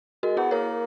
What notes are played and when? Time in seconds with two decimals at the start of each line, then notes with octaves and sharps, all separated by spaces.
0.23 G#3 F#4 A#4
0.37 B3 E4 G#4
0.51 A#3 A#4 C#5